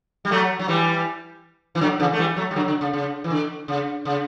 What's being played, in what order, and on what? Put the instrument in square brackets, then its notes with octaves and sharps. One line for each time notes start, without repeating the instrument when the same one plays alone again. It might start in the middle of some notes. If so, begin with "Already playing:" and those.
[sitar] G3
F#3 A3
F#3
E3 G3
E3
D3 F#3
C#3 E3
A3
E3 G3
F#3 A3
G3
D3 F#3
D3
C#3
C#3
E3
D3
C#3
C#3